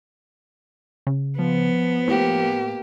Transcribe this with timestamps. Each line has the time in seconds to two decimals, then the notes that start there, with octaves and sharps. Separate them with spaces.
1.07 C#3
1.39 F3 B3
2.08 A2 A#3 G4